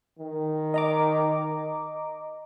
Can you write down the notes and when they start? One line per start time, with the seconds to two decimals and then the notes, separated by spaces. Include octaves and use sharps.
0.19 D#3
0.74 D#5 A#5 D6